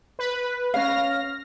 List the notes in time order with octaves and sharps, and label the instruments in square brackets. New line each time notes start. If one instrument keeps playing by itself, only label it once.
[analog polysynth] B4
[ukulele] C#4 C#5 F5 [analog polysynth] F6 A#6